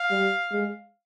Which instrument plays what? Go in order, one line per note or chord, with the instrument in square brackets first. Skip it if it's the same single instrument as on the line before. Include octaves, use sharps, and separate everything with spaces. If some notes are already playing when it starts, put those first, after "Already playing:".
Already playing: [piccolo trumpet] F5
[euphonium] G3
G#3